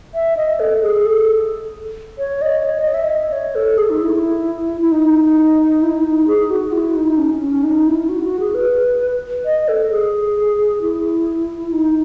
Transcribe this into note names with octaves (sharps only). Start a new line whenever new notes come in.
E5
D#5
A4
G#4
A4
C#5
D#5
C#5
D#5
E5
D#5
C#5
A4
G#4
D#4
E4
E4
D#4
E4
D#4
G#4
F#4
E4
D#4
C#4
C#4
D#4
E4
F#4
F#4
G#4
B4
D#5
A4
G#4
E4
D#4